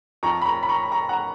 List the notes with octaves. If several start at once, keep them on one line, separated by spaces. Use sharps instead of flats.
F2 F3 A#5 C#6
B5
A#5 C#6
B5
A#5 C#6
B5
A#5 C#6
F#5 A#5